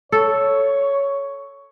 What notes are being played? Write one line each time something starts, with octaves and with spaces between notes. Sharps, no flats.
A4 C#5